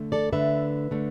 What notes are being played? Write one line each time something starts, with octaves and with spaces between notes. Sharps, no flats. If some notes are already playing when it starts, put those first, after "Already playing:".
Already playing: D3 A3
A4 D5
D3 A3 B4 E5
D3 A3